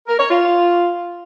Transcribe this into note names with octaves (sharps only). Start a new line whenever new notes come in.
A#4
C#5
F4